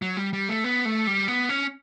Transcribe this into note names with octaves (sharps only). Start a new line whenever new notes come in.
F#3
G3
G3
A3
B3
A3
G3
B3
C#4